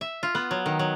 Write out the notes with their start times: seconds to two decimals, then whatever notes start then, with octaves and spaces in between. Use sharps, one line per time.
0.01 E5
0.23 F4
0.35 B3
0.51 F#3
0.66 D#3
0.79 F#3